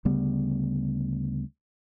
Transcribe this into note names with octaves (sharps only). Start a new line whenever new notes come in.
D2 C#3 G3 B3